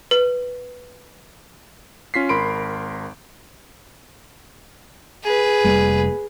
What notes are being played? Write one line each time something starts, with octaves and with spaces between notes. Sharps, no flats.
B4
C#4 F4 B6 C7
G#1 A#4 B5 C6 D7
G#4 B4
F1 G3 A#3